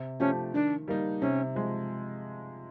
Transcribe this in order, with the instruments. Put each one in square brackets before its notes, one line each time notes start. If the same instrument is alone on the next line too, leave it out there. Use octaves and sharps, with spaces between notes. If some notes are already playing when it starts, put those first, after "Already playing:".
Already playing: [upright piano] C3
[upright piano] F3 A3 D4 G4 [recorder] C#4
[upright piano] D#3 [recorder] D4
[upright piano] G3 A#3 D#4
[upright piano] C3 [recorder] C#4
[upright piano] F3 G#3